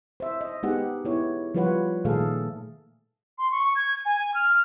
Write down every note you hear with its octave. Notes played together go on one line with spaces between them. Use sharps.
C5 E5
D#5
G#3 B3 D#4 G4 G#4 F#5
B3 E4 C#5
F3 G3 F4 B4 C#5 F#5
A#2 D#3 A3 G#4 A4 F5
C6
C#6
G#6
G#5
F6